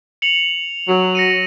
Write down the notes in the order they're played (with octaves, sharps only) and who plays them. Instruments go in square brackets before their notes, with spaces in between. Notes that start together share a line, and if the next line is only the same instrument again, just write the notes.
[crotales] C#7 F7 F#7
[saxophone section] F#3
[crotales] A#6 C#7 D#7